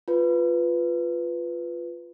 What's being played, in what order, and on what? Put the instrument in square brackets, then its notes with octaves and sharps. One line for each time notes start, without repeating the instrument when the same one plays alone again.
[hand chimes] F4 B4